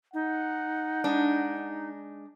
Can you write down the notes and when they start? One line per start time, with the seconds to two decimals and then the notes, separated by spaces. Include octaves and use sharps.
0.14 D#4 F#5
1.04 G#3 D4